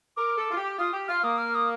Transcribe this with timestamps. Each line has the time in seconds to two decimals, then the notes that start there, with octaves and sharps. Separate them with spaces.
0.17 A#4 D6
0.37 A4
0.50 F4
0.57 G4
0.78 F4 D#6
0.93 G4
1.08 F4 F6
1.23 A#3 D#6
1.38 F6
1.55 D#6